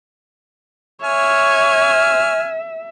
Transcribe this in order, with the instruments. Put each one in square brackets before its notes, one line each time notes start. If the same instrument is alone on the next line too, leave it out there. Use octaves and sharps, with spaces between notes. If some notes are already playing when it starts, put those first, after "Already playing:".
[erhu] C#5 [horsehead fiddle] E5 [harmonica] G#5 F6